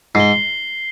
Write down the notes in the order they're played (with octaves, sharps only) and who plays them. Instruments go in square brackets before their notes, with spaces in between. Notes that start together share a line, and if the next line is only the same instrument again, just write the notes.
[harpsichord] G#2 [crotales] C7 G7